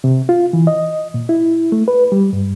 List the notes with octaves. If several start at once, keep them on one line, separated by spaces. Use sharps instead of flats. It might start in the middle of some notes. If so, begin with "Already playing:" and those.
C3
F4
E3
D#5
A#2
E4
A3
B4
G3
G2